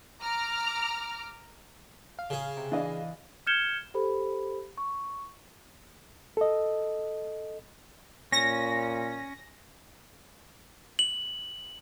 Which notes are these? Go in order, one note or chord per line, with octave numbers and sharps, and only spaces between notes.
A#5 D6 F6
F5
C#3 G#4
C3
E3 D4 D#5 F5
F6 G6 G#6 C#7 E7 G7
G4 A4 C5 B5
C#6
A4 D#5
A#2 C#4 A#6
F#7